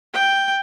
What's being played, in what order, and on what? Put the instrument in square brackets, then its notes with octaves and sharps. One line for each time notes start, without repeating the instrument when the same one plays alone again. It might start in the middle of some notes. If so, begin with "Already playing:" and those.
[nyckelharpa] G5